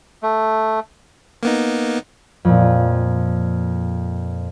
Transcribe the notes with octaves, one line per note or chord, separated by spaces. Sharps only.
A3
A#3 B3 D#4
F2 A#2